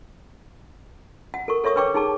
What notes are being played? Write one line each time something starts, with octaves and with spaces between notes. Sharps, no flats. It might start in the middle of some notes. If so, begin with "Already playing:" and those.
F#5
A4 A#4 C#6
A4 C#5 E5 C#6 D#6
B4 C#5 G5 C#6 D6
D#4 G#4 A5 D6